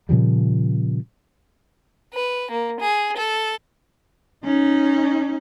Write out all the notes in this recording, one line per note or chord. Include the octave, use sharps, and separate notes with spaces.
A#2 C#3 F3 G3
B4
A#3
G#4
A4
C#4 D#4